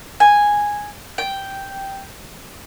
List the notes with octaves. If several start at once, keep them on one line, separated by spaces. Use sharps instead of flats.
G#5
G5